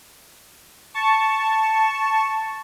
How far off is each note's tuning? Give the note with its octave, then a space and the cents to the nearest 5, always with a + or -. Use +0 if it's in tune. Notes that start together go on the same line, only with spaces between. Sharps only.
A5 +0 C#6 +0